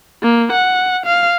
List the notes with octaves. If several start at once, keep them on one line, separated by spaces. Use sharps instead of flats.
A#3
F#5
F5